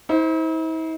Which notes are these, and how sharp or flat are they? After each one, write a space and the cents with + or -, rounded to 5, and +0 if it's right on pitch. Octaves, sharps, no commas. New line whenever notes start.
E4 -45 C5 +0